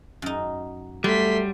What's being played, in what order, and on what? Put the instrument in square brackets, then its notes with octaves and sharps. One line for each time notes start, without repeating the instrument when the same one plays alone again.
[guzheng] F#2 D#4
[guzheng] F#3 [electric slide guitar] G3 [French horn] A3 [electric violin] C6 B6